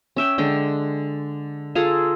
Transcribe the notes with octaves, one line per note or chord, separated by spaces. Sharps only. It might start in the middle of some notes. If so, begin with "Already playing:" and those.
C#4 E5 G5
D3 G#3 D4 G5
F4 G#4 A4 A#5